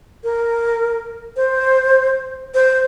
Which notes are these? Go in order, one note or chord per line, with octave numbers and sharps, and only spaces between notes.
A#4
C5
C5